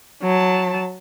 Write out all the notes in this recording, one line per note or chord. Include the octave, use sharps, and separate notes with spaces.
F#3 A5